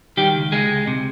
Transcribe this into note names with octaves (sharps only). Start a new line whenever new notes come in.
D#3 G3 G4
C#2
C#2 G#3 G#4
C#2
C3